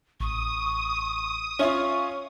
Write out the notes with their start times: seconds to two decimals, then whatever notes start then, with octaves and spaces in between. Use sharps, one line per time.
0.20 A1 C#6 D#6
1.59 C#4 F4 C#5 E5 F5 C#6